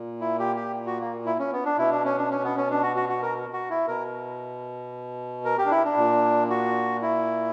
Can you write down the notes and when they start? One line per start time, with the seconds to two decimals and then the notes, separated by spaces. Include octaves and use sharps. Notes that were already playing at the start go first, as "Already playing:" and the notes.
Already playing: A#2
0.21 E4
0.39 G4
0.56 G4
0.86 F#4
1.01 A#3
1.26 E4
1.39 C#4
1.52 B3
1.65 D4
1.78 B2 E4
1.91 D4
2.05 C#4
2.18 D4
2.31 C#4
2.44 B3
2.57 C#4
2.70 D4
2.83 F#4
2.96 F#4
3.09 F#4
3.22 A#4
3.53 F#4
3.70 E4
3.87 B2 A#4
5.45 A#4
5.58 G4
5.65 D4
5.71 E4
5.85 D4
5.97 A#2
6.50 F#4
7.02 E4